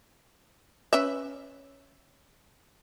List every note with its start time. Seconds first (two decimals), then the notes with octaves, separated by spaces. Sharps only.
0.93 C#4 B4 E5